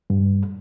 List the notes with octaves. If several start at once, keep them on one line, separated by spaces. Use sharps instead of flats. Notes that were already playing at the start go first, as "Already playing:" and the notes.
G2